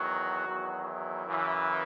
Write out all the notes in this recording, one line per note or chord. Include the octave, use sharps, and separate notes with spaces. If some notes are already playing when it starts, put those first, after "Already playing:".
Already playing: E2 D#3 F#3 F#4
E2 D#3 F#3
E4
F#2 C#3 E3